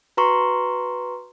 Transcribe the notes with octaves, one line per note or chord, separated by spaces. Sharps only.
F#4 B4 A#5 C6 C#6